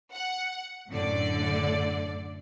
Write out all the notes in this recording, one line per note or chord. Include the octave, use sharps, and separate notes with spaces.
F#5
F#2 A2 D3 D5